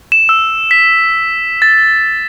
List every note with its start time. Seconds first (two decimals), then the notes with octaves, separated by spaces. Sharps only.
0.12 E7
0.29 E6
0.71 B6
1.62 A6